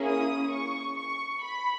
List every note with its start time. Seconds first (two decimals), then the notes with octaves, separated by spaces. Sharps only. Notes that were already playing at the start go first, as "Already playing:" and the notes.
Already playing: A#3 C#4 E4 G#4
0.08 D#6
0.53 C#6
0.98 C#6
1.43 B5